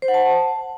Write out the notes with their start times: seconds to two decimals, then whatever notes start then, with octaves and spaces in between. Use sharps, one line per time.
0.02 C5
0.08 F#5
0.14 A5